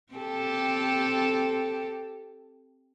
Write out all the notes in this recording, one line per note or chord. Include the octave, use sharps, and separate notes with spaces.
C4 G4 A4